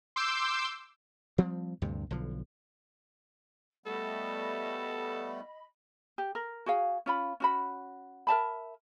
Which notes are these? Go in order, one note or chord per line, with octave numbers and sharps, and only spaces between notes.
C6 D6 E6 G6
F3 G3 C4
D2 G2 C3
B1 D3 F3
G3 A3 B3 A4 D#5 B5
G4
A#4
F#4 G#4 F5
C#4 F4 B5
C#4 F#4 B5
A#4 E5 A5 B5